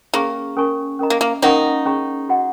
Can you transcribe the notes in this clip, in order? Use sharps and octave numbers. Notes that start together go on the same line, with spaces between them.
A#3 C#4 G#4 C#5 A#5 C#6
C#4 A#4 C#5 G#5 C#6
C#4 A#4 D#5 A#5
A#3
A#3
A#3 C#4 D#4 A#4 F#5 A#5 C#6
C#4 G#4 C#5 A#5 C#6
F#4 D#5 F#5